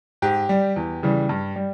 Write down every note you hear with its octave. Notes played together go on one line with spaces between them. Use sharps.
G#2 G4
G3
E2
C#3 E3 G3
G2
G3